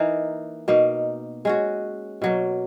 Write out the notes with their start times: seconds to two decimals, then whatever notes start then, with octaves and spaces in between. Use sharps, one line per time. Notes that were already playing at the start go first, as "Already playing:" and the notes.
Already playing: E3 A#3 D#4 A#4
0.68 B2 A#3 D#4
1.45 G#3 C#4 F#4
2.22 B2 F#3 A#3